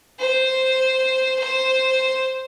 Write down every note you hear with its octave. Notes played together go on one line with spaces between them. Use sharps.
C5
C5